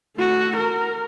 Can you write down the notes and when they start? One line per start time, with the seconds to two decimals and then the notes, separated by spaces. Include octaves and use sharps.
0.16 A3 F#4
0.56 A#4